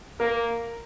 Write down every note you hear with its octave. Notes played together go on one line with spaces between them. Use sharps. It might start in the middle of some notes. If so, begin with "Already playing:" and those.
A#3 A#4